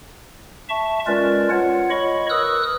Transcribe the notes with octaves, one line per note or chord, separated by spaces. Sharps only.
E5 A5 C#6
G#3 C#4 F4 A#4 B4 D5
F4 C#5 F#5
C#5 D#5 B5 C#6
A#4 B4 D#6 E6 F#6